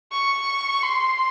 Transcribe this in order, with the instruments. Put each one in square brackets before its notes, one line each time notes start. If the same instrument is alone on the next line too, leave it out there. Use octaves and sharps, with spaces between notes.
[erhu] C#6
C6